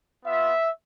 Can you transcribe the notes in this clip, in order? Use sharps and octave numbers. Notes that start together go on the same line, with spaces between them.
B3 F4 E5